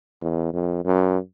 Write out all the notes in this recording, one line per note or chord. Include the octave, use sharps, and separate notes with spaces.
E2
F2
F#2